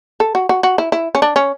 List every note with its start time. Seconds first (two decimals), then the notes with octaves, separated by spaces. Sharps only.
0.20 A4
0.35 F#4
0.49 F#4
0.63 F#4
0.78 E4
0.92 E4
1.15 C#4
1.22 D4
1.36 C#4